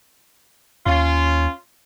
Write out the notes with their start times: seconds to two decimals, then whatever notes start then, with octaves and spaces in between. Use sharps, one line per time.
0.86 D#2 C#4 F4